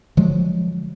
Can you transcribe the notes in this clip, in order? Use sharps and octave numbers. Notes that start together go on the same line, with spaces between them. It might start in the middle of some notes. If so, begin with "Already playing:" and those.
D3 F3 F#3 G#3